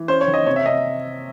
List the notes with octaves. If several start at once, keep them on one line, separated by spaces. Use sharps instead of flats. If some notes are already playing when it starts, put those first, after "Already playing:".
Already playing: E3
C#4 C5
C#5
D#3
D#5
C3 C#5
E5
C3 D#5